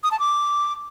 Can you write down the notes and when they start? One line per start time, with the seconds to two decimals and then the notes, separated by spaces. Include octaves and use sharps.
0.03 D#6
0.11 A5
0.20 D6